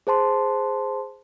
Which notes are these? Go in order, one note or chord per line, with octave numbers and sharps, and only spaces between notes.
G#4 C5 A5 C6